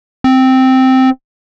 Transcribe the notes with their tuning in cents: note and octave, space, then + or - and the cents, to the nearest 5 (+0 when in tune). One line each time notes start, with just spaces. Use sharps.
C4 -5